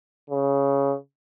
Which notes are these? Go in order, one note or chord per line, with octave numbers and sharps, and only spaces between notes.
C#3